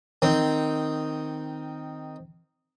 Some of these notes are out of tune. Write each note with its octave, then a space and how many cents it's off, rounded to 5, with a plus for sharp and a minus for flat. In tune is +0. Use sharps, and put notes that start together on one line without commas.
D#3 +0 C4 -5